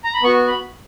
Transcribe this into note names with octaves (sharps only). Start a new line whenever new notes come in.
A#5
B5
B3 F#4 C#6
B5